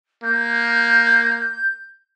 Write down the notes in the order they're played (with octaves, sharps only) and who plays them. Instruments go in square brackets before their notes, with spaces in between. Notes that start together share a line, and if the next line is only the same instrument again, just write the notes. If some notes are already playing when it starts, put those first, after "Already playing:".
[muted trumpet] A#3 [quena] G6